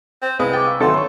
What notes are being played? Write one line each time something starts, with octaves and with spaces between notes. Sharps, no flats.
C4
C2 G#3 E4 B4 F5 D#6
G5 D6 A6
F5 C#6 E6
G#1 E3 F#3 A4 F5 F#5 C6
C#5 C6 C#6